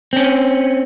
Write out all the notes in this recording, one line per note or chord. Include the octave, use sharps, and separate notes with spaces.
C4 C#4